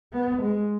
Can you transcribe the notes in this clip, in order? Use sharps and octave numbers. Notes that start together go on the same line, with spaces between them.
B3
G#3